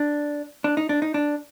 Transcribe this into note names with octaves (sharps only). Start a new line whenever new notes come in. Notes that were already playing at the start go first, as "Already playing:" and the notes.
Already playing: D4
D4
D#4
D4
D#4
D4